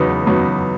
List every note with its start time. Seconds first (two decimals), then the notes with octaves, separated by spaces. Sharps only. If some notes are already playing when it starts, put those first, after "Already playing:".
Already playing: E2 C#3 F#3 B3 D#4
0.26 E2 C#3 F#3 B3 D#4